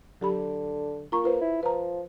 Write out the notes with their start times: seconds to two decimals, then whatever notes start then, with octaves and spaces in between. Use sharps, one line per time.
0.21 D3 F#3 G4 B5
1.12 A#3 F4 A#5 C#6
1.24 F4 B4 C5
1.41 E4
1.63 F3 B4 A#5